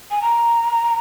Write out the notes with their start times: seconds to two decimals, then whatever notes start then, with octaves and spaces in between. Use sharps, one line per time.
0.11 G#5
0.22 A#5